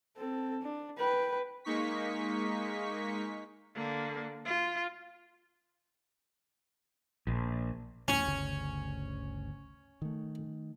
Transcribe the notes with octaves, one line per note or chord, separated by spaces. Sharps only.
C4 A4
D4
B4 G5
G#3 A#3 D#4 C#6 B6
D3 A#3
F4
A#1
E2 A2 C#4
G1 D2 C#3
D#3 A3